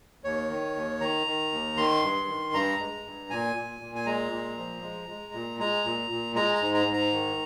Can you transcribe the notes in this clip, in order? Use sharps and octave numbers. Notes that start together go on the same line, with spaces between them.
D#2 C#5
D#3
D#2
D#3 A#5
D#3
D#2
D#3 C6
G2
D#3
G2 A#5
G#3
G2
A#2 G#5
A#2
A#2
G#5
G#3 A#5
A#2
F3
G#3
G#3
A#2
G#3 A#5
A#2
A#2
G#3 A#5
A#5
G#2
A#5
G#2
A#5
D#3